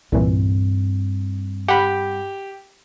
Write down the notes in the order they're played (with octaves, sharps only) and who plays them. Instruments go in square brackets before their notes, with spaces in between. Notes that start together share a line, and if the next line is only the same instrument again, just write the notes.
[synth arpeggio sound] C2 A#2 E3 [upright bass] G2 C4
[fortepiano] G4 [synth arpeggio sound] F#5 B5